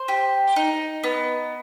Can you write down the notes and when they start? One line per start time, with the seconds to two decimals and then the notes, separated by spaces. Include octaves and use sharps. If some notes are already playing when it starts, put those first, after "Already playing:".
Already playing: C5
0.08 G4
0.56 D#4
1.04 B3